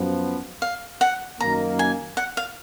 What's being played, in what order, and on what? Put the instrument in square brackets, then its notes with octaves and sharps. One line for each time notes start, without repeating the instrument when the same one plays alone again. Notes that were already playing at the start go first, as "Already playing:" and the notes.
Already playing: [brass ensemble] F#2 F3 B3
[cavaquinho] F5
F#5
[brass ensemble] F#2 D#3 A#3 [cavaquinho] A#5
[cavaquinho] G#5
F#5
F5